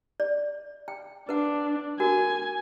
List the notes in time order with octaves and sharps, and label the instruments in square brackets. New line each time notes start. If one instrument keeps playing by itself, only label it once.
[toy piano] D5
G5
[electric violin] D4 [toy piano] B4 F#5
[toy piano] F#4 A#4 [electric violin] G#5